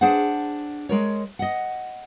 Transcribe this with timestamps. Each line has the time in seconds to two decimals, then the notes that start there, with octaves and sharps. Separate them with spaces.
0.01 D4 G#4 C5 F#5
0.89 G#3 A#4 C#5
1.39 D#5 F#5